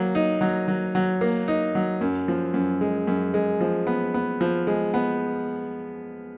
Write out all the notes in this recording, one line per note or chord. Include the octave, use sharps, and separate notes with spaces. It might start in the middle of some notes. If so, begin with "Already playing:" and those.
Already playing: F#3 A#3
D#4
F#3
F#3
F#3
A#3
D#4
F#3
F#2
F3
F#2
G#3
F#2
G#3
F3
B3
B3
F3
G#3
B3